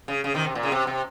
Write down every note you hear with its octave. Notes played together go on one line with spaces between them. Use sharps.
C#3
C#3
C3 D#3
C3
A#2
C#3
C3
C3